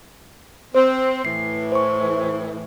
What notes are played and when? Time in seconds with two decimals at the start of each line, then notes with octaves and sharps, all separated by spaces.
0.75 C4 C5
1.25 A2 E3 C7
1.72 C5 C#6